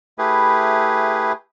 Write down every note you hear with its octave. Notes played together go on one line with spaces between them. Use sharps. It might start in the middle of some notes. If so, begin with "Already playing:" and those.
A3 E4 G4 G#4 B4